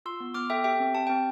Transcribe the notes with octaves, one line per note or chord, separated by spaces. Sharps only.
F4 C6 E6
B3
B3 D6 F6
A4 E5 G5
G4 E5 G5
C4
G4 A5
C4 G5